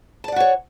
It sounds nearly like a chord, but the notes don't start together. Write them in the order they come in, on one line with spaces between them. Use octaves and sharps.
A5 D5 F#5 F#4 C#5